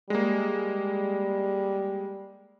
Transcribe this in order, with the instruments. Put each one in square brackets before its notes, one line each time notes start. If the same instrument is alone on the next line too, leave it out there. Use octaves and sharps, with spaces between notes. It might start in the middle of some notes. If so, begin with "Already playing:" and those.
[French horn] G3 [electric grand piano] G#3 A#3